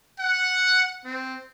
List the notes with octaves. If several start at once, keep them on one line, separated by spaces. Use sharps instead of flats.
F#5
C4